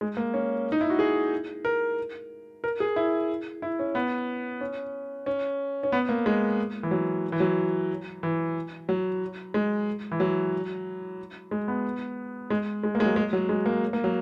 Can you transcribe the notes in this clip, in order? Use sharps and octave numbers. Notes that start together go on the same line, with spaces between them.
G#3
A#3
C#4
D#4
E4
F#4
G#4
A#4
A#4
G#4
E4
E4
C#4
B3
C#4
C#4
C#4
B3
A#3
G#3
E3
F#3
E3
F#3
E3
F#3
G#3
E3
F#3
G#3
B3
G#3
G#3
A#3
G#3
F#3
G#3
F#3
G#3
A#3
A#3
F#3